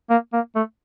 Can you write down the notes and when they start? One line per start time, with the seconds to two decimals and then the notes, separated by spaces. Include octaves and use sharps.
0.10 A#3
0.33 A#3
0.55 A3